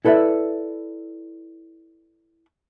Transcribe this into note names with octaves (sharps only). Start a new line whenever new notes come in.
E4 A4 B4 D5 E5